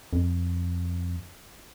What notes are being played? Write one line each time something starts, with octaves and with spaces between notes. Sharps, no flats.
F2